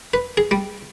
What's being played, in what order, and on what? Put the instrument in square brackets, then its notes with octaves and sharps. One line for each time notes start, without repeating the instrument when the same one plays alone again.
[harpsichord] B4
G#4
G3